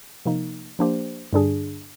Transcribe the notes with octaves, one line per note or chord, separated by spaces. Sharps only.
C3 F3 A#3 D#4
F3 A#3 D4 G4 C5
G2 D3 G3 D4 G#4